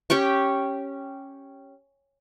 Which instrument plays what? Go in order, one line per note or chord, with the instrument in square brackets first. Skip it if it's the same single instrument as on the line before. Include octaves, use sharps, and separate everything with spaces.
[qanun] C#4 G4 G5 C#6